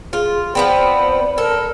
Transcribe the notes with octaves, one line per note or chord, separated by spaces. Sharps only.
F4 G#4
F3 B3 C4 D5 B5
A4 A#4